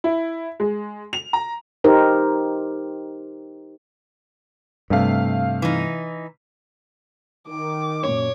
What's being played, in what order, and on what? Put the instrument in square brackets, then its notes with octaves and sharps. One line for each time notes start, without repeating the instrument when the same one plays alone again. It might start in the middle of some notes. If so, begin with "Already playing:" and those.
[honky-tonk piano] E4
G#3
F7
A#5
[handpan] D#4 G4 A#4 C5
[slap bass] G2 [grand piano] C3 A3 F5
[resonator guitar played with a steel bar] E3 D#4
[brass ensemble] D#3 [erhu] D6
[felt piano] F#2 A#2 [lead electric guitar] C#5